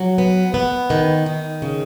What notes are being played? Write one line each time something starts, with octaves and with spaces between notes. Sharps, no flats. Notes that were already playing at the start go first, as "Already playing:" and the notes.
Already playing: F#3
B3
B3
D#3
D#3
C#3